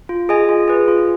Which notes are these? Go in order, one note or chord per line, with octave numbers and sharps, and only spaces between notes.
F4
G#4 D#5 G#5
F4
G#4 B4
F4